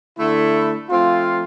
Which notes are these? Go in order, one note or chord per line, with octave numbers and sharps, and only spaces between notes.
D3 A3 E4
F3 A3 C4 F4